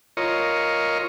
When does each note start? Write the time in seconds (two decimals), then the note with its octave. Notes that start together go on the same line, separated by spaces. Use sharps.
0.17 F4 A#4 C#5 D#5